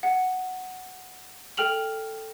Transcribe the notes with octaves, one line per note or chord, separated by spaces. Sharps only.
F#5
A4 G5 F6 F7 F#7